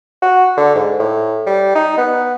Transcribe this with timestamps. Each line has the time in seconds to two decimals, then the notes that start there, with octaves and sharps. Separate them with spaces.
0.22 F#4
0.57 D3
0.75 G#2
1.00 A2
1.46 G3
1.75 D#4
1.98 B3